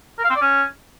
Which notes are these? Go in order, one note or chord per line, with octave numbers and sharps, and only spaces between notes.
A#4
F5
C4
D5
C#4